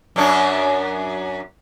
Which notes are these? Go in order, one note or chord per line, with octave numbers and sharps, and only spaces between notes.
F#2 F#3 D4